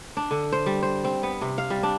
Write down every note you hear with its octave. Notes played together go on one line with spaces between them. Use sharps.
D4
D3
C5
G3
C5
C4
B3
C3
F5
G3
D4